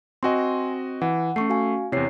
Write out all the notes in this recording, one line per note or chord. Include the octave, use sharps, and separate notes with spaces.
C4 F#4 D#5 G#5 C6
E3 F#5
A3 C#4 C#6 C7
F#4 F5 G#5
E2 C3 E4 C#5 C7